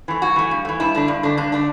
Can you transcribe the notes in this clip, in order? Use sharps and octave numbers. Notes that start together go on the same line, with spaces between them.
E3 A3
G2 F#4
E3 A3
G2
E3 A3
G2 E4
D3 A3 D4
G2
D3 A3 D4
G2 D4
D3 A3 D4